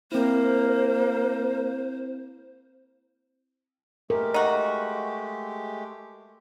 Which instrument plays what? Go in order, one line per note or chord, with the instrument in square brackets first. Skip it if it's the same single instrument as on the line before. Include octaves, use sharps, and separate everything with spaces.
[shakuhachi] A#3 [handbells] C4 E4 [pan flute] C5
[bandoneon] G#3 A3 G4 [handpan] A#4
[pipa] D#4 F#4